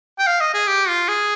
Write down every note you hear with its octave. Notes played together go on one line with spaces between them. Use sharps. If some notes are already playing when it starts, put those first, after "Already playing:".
G5
F5
D#5
G#4
G4
F4
G#4